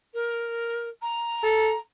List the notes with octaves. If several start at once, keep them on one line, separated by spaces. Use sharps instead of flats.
A#4
A#5
A4